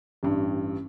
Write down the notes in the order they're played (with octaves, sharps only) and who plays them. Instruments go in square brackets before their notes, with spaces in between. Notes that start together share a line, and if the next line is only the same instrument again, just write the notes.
[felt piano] A1 G2